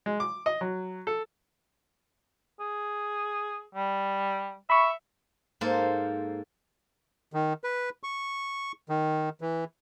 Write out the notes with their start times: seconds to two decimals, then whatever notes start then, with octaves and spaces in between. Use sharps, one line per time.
0.06 G#3
0.20 D6
0.46 D#5
0.61 F#3
1.07 A4
2.60 G#4
3.75 G3
4.70 E5 B5 C#6
5.61 G#2 A#3 A4 A#4 C5
7.33 D#3
7.64 B4
8.03 C#6
8.89 D#3
9.41 E3